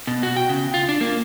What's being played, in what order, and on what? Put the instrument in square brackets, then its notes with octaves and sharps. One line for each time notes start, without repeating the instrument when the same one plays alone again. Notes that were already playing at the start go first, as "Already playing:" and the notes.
[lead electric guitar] B2
F#4
G5
C#3
F4
D4
A#3